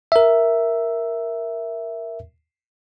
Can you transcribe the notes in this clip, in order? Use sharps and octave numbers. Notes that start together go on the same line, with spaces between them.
A#4 E5